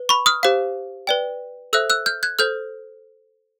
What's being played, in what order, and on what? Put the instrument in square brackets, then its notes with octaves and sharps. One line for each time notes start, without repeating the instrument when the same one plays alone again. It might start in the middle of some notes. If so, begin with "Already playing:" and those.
Already playing: [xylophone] B4
B5 C#6
D#6 F6
G4 C5 F5
B4 D5 G5
A4 C5 E5 E6 F#6
E6 F#6
F6 G6
F#6 G#6
A4 C5 F6 G6